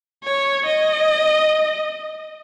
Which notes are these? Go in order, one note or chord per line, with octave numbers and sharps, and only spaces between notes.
C#5
D#5